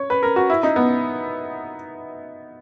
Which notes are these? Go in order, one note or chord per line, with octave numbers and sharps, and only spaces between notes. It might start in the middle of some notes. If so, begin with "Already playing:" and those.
Already playing: C#5
B4
A#4
F#4
E4
D#4
B3